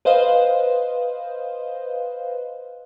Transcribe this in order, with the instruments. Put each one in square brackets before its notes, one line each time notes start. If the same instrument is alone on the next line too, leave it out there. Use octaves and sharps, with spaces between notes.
[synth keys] B4 C5 D#5 F5